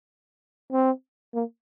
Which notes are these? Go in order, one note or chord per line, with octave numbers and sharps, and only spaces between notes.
C4
A#3